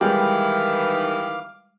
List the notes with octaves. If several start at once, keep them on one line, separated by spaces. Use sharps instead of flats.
D#3 E3 G3 G#3 F5 G5 D6